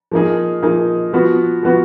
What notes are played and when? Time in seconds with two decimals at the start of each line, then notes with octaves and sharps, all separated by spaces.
0.12 F3 A#3 D#4 G#4
0.62 F3 A#3 D#4 G#4
1.13 F3 B3 F#4
1.63 F3 B3 F#4